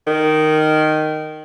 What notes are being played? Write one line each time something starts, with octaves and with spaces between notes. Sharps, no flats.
D#3